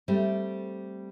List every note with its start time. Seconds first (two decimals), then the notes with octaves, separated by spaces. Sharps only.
0.08 G3 A3 C4